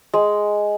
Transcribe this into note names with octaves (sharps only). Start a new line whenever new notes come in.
G#3